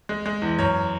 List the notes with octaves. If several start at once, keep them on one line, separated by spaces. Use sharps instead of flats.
G#3
G#3
E2
F#2 C#5